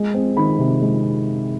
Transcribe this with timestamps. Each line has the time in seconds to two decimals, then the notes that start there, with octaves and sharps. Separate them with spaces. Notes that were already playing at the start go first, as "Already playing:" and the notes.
Already playing: G#3
0.14 C4
0.37 D#3 B5
0.59 C3
0.82 G#3